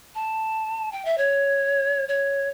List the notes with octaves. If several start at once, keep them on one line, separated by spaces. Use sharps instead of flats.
A5
G5
E5
C#5
C#5